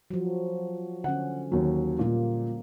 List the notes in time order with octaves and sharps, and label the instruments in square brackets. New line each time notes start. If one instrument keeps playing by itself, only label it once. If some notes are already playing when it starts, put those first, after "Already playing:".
[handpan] F3 F#3
[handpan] D3 C#4 [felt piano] F#5
[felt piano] D#2 F#3
[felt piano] A#2 [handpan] G3 A#3